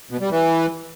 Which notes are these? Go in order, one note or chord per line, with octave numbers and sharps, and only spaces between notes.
B2
G3
E3